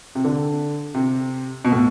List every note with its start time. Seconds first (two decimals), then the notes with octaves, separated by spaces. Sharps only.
0.15 C3
0.24 D3
0.94 C3
1.65 B2
1.72 A2